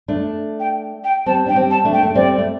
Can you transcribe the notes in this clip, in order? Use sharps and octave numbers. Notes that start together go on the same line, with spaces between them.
A3 D4
G5
G5
G3 C4 A5
D4 G5
G3 C4
A5
A3 D4
G5
A3
G3 C4 D5
A3